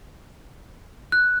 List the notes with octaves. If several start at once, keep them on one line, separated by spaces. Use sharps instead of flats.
F#6